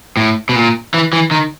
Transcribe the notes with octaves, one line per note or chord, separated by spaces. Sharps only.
A2
B2
A#2
E3
E3
D#3